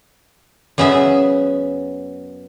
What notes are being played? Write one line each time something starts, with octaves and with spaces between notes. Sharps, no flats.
F#2 C#3 B3 G#4 E5 G#5